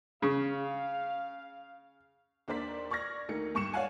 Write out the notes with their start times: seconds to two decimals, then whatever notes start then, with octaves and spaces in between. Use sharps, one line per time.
0.22 C#3 F5
2.48 D#2 D4 A#4 C5 D5 B6
2.91 D5 C#6 F6 G#6 A#6
3.29 D2 D#3 A#3 C#7
3.55 G2 C#6 C#7 E7
3.74 C#5 D5 F5 F#5 G#5